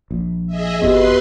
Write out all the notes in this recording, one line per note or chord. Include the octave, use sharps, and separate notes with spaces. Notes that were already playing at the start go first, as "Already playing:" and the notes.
A#1
G#4 D#5 E5
G1 F2 B3 F#4 G4 B4 D#5 C6